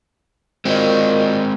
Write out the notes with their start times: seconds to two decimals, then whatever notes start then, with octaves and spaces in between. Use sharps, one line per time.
0.65 A#2 G#3 C4 F#4 D#5